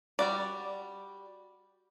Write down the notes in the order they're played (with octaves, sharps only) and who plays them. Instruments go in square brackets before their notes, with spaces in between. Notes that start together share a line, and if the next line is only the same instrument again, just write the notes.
[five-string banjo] G3 F#4 D5